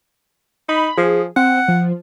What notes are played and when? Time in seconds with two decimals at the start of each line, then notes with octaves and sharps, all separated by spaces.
0.69 D#4 B5
0.98 F3 G#4
1.36 C4 F#5
1.68 F3